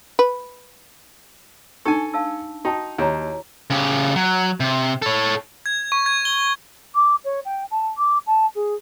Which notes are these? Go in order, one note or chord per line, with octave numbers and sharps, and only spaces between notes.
B4
D4 D#4 A4 G#5 C#6
F5 A5 E6
D#4 F#4 G5 A5
D#2 E4 C#5 A#5
C#3 G4
F#3
C3
A4 C#5
G#6
C#6
G#6
G7
D6
C#5
G5
A5
D6
A5
G#4